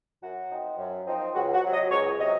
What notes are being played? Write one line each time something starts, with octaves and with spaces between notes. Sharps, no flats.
F#2 F#4
F3 C4 D#4
F#2
F3 C4 D#4
C#2 F#4
F#4
C3 F#3
D#5
C#2 C#5
C3 F#3 D#5